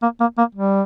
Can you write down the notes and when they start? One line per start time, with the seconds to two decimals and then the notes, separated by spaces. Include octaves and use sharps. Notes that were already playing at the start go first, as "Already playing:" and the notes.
0.02 A#3
0.20 A#3
0.38 A#3
0.55 G3